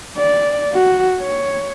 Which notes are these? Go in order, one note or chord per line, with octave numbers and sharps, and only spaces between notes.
D5
F#4
C#5